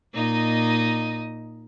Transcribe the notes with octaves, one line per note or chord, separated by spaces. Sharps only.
A#2 D#4 D#5